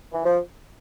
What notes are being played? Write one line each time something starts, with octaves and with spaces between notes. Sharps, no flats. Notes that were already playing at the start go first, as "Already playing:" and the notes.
E3
F3